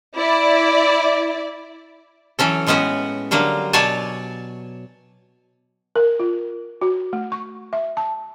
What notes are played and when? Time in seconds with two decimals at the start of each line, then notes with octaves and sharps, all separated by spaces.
0.15 E4 D5
2.39 E3 F#3 C#4 A4
2.67 A2 G#3 B3 C#4 F#4 B4
3.31 D3 F#3 G3 A#3
3.73 B2 F#3 C#5 D5 G#5 A5
5.96 A#4
6.19 F4
6.82 F#4
7.13 A3
7.32 C#6
7.73 E5
7.97 A5